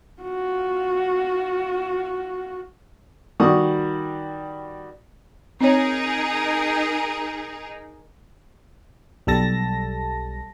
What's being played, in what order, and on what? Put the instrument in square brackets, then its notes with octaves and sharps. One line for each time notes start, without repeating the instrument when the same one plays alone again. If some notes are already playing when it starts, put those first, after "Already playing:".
[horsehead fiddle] F4 F#4
[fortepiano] D#3 G3 F#4 C#6 D#6
[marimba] C4 C#5 [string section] D#4 G#4 A#4
[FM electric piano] B1 G3 A4 A5 A#6